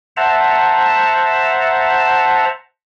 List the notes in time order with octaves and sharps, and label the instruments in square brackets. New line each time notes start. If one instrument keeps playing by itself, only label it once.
[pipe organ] C5 E5 F#5 A5 A#5